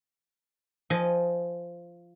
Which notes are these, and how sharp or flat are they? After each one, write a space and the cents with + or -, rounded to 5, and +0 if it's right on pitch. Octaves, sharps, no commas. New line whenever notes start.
F3 -10 D#5 +0 G#5 -15